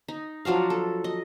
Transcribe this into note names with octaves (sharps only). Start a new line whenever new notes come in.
D#4
F3 F#3 D4 F5
A4
D#5